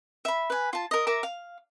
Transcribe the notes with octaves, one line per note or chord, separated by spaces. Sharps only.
E5 B5
B4 G#5
F4 A5
A#4 D#5
A#4 E5 A#5 D6
F5